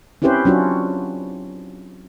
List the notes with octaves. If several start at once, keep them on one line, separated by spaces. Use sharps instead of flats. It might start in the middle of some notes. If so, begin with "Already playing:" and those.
C4 C#4 E4 G4 B4 C5
F#3 C#4 D4 F4 F#4